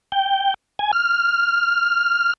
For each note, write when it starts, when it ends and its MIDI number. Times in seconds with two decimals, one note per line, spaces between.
0.12 0.54 79
0.79 0.92 80
0.93 2.33 89